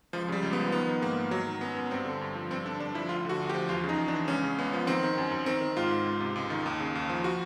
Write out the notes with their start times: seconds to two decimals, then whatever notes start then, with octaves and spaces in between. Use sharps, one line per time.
0.13 C#2 F3
0.28 C#3 G3
0.43 C#2
0.53 B3
0.58 F3
0.72 D#3 B3
0.87 D#3
1.02 G#2 A#3
1.17 G#2
1.31 D#3 F#3
1.47 D#3
1.61 F#2 B3
1.77 F#2
1.91 G2 C4
2.05 D3
2.21 G2
2.35 F3
2.50 G2 C4
2.65 D3 D4
2.80 G2 D4
2.94 F3 E4
3.09 D2 F4
3.25 D3 F#4
3.40 D2
3.49 G4
3.54 F3
3.68 E2 F4
3.84 C#3
3.89 D#4
3.98 E2
4.08 D4
4.13 E3
4.28 C#2 C#4
4.43 C#3
4.58 C#2 B3
4.73 F3
4.87 D#3 C4
5.03 D#3
5.18 F#2
5.31 F#2
5.46 D#3 C4
5.61 D#3
5.77 G#2 F4
5.91 G#2
6.06 C#2
6.20 C3
6.36 C#2
6.50 D#3
6.66 D#2
6.80 C#3
6.95 D#2
7.09 F3
7.24 F#4